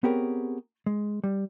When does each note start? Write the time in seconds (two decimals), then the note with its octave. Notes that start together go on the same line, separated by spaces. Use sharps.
0.04 B3 C4 G4 G#4 A#4 C#5
0.86 G#3
1.24 G3